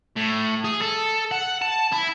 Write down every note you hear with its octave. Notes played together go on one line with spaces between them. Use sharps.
A2
G#4
A4
F#5
A5
E4